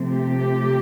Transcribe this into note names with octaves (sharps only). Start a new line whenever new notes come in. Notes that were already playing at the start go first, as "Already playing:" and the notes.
Already playing: C3 F3 A3 C4
G4